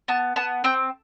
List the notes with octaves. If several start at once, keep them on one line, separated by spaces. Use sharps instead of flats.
B3 A5
B3 A5
C4 G5